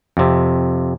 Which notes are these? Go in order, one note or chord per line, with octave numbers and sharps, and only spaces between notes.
F2 C3